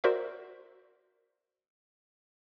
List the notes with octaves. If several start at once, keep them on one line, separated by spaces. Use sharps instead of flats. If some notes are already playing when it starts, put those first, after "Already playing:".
F#4 A#4 C5 D5 E5